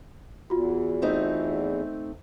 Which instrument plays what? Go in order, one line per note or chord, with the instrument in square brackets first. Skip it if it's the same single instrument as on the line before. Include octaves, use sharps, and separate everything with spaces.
[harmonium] E2 [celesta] F4 F#4
[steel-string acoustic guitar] A3 C4 D#4